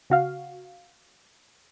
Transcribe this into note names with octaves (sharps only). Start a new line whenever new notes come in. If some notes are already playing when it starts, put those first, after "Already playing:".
C#3 F#4 F5